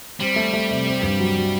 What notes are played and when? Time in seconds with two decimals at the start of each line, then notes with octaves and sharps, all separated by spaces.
0.20 G3 C4
0.36 A3
0.53 A3
0.70 C3
0.87 C4
1.03 G2
1.19 F#3
1.37 F#3